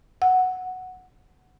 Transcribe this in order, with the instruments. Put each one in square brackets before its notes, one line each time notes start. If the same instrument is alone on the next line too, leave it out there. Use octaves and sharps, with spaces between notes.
[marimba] F#5